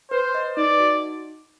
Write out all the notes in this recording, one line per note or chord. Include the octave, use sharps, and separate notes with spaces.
B4 C5
D#5
D#4 D5
F#4